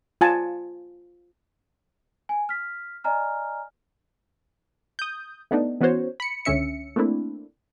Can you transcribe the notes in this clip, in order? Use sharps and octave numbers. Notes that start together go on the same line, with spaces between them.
F4 G#5 A5
G#5
F6 B6
D5 D#5 G#5 A#5 F6
D#6 G6
A3 B3 D4 D#4
E3 B3 C#4 F#4 C5 C#5
B5 C#7
C#2 D3 C#4 E5 C#7
A3 A#3 C4 D4 E4